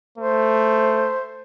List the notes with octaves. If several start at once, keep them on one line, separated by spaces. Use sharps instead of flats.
A3 C5